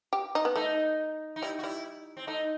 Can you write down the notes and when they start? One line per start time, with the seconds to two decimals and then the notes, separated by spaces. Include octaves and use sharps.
0.13 G4
0.35 D#4
0.45 B3
0.56 A3 D#4
1.36 D#4
1.42 G3 E4
1.59 F#4
1.63 G3 E4
2.17 C4
2.27 A3 D#4